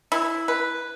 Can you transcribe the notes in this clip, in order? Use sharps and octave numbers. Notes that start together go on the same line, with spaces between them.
E4
B4